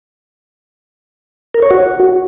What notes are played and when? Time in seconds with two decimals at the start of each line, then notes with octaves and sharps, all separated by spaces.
1.54 A#4
1.62 C#5
1.71 F#4